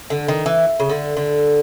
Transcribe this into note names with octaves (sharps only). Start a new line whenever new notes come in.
D3
D#3
E3
C#3
D3
D3